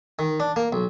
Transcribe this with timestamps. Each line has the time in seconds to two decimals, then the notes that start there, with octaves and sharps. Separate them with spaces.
0.19 D#3
0.40 D4
0.56 A#3
0.72 B1